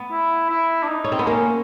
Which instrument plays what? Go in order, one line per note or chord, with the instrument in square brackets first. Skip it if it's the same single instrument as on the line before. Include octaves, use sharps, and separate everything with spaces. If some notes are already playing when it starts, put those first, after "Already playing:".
Already playing: [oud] B3
[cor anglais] E4
E4
D4
D#4
[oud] C#4
C4
B3
[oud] A#3 [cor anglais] C#4